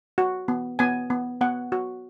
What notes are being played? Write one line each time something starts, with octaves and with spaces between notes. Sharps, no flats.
F#4
B3
B3 G#5
B3
B3 F#5
F#4